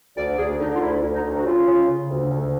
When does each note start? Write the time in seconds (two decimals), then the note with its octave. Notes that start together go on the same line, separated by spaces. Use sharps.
0.17 D2 D5
0.38 D2 G#4
0.60 D3 D#4
0.75 F4
0.81 D2 E4
1.03 D2
1.13 D#4
1.24 D2
1.37 F#4
1.45 C#3 F4
1.67 C#3
1.88 C#3
2.09 D2
2.30 D2